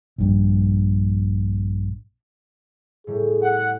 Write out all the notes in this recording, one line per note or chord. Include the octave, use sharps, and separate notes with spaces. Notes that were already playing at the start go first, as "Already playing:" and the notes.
A#1 G2
A2 G3 G#4
F#5